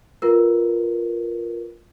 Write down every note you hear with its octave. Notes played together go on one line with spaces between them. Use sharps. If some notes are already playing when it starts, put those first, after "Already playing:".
F4 A#4 B4